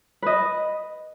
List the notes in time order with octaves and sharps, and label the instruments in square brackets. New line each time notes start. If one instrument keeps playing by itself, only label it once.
[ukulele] B4 D#5